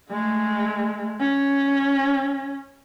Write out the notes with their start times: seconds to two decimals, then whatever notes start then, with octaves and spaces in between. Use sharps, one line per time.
0.11 G#3 A3
1.20 C#4